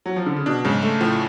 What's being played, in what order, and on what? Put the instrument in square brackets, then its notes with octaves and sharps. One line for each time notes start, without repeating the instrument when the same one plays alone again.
[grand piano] F#3
F3
D3
C#3
[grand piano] B2 [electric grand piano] D4
[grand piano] G#2 [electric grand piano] C#3
[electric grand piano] A3
[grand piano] A2 [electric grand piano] F3